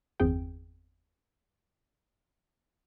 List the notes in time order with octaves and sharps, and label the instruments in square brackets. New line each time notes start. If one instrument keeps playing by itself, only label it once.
[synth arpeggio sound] G1 E2 C4 G#4 G5